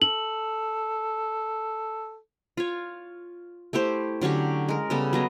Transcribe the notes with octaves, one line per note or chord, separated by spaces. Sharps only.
A4 F#7
F4 C#5
A3 E4 G4 C5
D3 F#3 C#4 G4
G#3 A#4
C#3 G3 B3 A4
F#3 B3 D#5